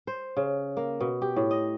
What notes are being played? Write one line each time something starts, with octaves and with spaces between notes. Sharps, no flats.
C5
C#3
A#3
B2
G4
A2
D#5